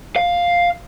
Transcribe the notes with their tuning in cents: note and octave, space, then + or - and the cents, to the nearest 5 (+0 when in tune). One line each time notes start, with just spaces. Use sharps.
F5 +5